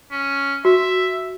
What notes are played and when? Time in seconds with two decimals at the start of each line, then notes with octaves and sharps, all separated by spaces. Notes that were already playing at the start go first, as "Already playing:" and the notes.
0.12 C#4
0.65 F#4 E5